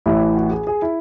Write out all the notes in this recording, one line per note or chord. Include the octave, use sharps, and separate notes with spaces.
A1 A2 E3 E4
F#4
G#4
G#4
E4